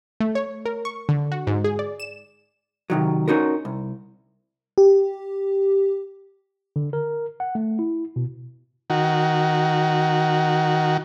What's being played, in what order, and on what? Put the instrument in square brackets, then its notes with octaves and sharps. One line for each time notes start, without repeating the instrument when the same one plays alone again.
[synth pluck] A3
C#5
A#4
C#6
D3
F#4
G#2
G#4
D5
E7
[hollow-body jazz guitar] C3 D#3 F#3
C#4 D#4 F#4 A#4
C2
[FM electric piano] G4
[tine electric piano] D3
A#4
F#5
A3
E4
B2
[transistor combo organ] D#3 F#4